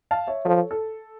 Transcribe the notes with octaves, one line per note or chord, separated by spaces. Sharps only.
F5 A5
C#5 E5
F3 A4 C#5
A4